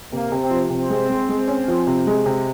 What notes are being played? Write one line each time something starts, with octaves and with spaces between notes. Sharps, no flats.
C3 A#3
C3
C4
F3
C3 C4
G#3
G#3
G#3
C#4
F3
C3
G#3
C3